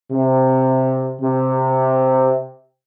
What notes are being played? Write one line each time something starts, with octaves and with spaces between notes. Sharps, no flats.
C3
C3